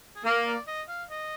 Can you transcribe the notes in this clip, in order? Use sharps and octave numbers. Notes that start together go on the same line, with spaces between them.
G#4
A#3 A#4
D5
D#5
F5
D#5